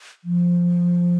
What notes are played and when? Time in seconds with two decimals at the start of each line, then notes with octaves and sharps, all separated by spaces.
0.24 F3